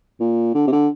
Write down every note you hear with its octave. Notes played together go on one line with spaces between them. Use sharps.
A#2
D3
C3
D3